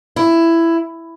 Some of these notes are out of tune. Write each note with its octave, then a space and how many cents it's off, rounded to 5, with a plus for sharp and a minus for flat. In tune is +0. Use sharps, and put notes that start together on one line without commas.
E4 +10